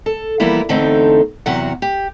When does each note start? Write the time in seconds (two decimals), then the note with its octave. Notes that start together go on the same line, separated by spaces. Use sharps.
0.06 A4
0.40 E3 F3 G3 A#3 B3 E4
0.69 E2 D3 A3 C4 D#4 A4
1.46 E2 C3 F#3 F#4 F#5
1.82 G4